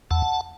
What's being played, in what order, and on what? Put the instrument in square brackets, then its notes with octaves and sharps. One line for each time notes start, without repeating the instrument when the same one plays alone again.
[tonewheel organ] E2 F#5 A5